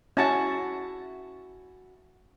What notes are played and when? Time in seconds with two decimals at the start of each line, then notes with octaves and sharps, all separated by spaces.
0.17 C#4 E4 F#4 A5